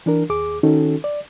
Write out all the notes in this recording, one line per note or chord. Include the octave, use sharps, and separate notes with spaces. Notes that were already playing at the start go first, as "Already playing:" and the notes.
E3 D4 A#4
D#2 G#4 D6
D#3 C#4 D#4 F#4 A4
D5